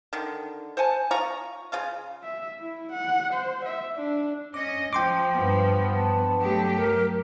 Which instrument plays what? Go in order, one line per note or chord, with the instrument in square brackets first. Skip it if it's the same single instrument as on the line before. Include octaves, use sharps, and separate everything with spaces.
[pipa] D3 D#3
C5 F#5 G#5 A5
F4 C#5 A#5 C#6
C#3 F4 F5
[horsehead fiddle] E5
E4
F#5
C5
E5
D4
[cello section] C#4 D#5 [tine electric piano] D6
[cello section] F3 [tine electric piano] G5 C6 D6
[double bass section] G2 B3
[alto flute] A5
[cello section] F#3 A3 G4
[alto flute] A#4